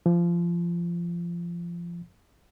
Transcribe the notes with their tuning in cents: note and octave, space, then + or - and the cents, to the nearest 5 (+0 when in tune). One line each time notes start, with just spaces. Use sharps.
F3 -20